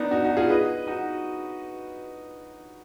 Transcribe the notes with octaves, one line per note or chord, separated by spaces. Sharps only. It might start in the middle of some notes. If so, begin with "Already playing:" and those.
Already playing: B3 D4 D#4
D#4 F#4
D#4 F#4
F4 G#4
B4 D#5
D#4 F#4